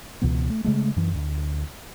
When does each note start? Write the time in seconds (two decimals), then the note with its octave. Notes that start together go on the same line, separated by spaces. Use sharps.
0.22 C#2 B2 E3 B3
0.49 A3
0.64 C#3 G#3 A3
0.96 F#2 E3
1.15 D2